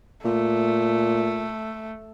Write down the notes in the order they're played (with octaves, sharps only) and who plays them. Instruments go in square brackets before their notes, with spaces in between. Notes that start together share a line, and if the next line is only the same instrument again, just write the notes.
[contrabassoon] A#2 [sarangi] A3